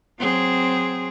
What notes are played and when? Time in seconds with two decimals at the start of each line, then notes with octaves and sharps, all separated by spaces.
0.19 F#3 C4 G#4